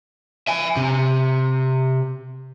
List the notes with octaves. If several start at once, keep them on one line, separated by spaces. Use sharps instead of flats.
E5 G#5
C3